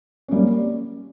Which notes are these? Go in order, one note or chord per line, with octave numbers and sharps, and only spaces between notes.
G3 A#3 C#4